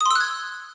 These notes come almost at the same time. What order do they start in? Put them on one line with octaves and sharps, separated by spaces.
D#6 C6 E6 F#6 G#6